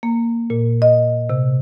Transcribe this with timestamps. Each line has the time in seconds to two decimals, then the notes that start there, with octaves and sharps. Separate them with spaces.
0.03 A#3
0.50 A#2
0.82 D#5
1.30 C3